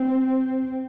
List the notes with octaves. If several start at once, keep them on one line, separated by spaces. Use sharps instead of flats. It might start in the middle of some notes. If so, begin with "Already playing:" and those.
Already playing: C4